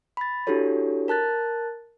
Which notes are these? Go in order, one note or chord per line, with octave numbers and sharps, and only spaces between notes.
B5 A6
D4 E4 F#4 G4 A4 C#5
A#4 A5 F#6 A6